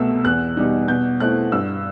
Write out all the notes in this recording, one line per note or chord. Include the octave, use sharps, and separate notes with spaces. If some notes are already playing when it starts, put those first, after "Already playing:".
Already playing: C2 B2 A3 E6
E2 F#6
B2 G3 D#4
B2 G6
A3 C4 E4 F#6
G2 E6